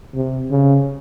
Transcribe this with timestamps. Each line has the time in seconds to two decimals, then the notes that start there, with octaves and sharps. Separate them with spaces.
0.15 C3
0.51 C#3